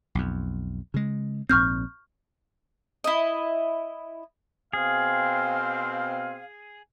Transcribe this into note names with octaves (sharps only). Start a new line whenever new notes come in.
B1 F2
C#3 G#3
A#1 G#2 C4 C#6 F6 G6
E4 D#5
B2 C4 G#4 F5